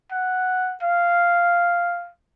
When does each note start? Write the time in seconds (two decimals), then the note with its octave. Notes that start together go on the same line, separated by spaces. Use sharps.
0.12 F#5
0.83 F5